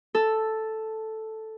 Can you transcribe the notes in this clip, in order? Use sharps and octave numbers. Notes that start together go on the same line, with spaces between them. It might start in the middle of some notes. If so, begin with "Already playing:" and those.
A4